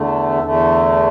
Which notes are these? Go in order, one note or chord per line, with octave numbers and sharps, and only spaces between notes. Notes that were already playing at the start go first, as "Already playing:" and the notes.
Already playing: E2 D3 A3
E2 D3 A3